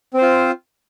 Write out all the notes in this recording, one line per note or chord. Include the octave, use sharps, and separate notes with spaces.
C4 F4 C5